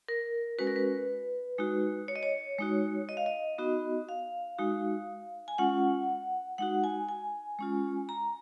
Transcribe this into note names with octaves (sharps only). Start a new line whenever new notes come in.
A#4
G#3 C#4 F#4 B4
A#4
B4
G#3 D#4 F#4
C#5
D#5
C#5
G#3 D#4 F#4
D#5
F5
D#5
B3 D#4 F#4
F5
G#3 D#4 F#4
G#5
G#3 C#4 F4 F#5
G#3 D#4 F#4 F#5
G#5
G#5
G#3 C#4 F4
A#5